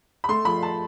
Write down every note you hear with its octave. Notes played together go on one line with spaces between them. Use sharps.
B5
A3 C6
F3 B5
A5